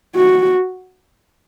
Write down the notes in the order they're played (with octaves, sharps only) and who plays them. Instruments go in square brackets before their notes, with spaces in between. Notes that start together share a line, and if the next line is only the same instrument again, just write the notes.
[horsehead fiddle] F#4